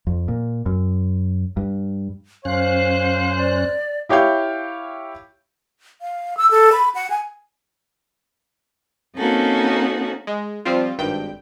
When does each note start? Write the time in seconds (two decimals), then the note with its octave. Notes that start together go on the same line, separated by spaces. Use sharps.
0.07 F2
0.28 A#2
0.66 F#2
1.57 G2
2.45 F#2 C#4 C5 F5 F#6
3.37 D5
4.09 E4 G4 C#5 F5 G6
6.01 F5
6.37 E6
6.51 A4
6.72 B5
6.95 F#5
7.10 G#5
9.17 A#3 C4 C#4 D#4 F#4 A4
10.27 G#3
10.65 F3 G3 C4 F4
10.99 G#1 G2 G5